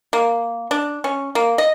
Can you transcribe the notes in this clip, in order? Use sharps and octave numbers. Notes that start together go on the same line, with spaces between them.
A#3
D4
C#4
A#3
D#5